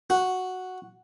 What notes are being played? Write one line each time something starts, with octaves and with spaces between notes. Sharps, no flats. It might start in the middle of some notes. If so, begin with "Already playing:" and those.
F#4